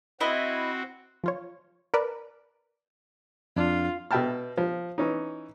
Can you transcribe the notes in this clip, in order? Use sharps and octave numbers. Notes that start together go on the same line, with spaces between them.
C4 E4 F#4 D#5 B5
F3 F4 C#5
A#4 B4 D5 A5
F2 D4 F4
B2 E5 G5 A5 F6
F3
E3 C#4 D#4